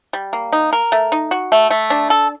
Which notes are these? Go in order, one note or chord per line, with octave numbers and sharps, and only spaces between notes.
G3
A#3
D#4
A#4
A3
D#4
F#4
A3
A3
D4
A4